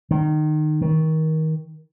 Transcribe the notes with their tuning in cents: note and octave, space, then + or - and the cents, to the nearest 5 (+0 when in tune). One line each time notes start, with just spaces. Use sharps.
D#3 -25
D#3 +25